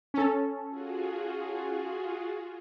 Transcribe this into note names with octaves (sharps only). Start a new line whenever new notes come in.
C#4 A4
F4 F#4 G#4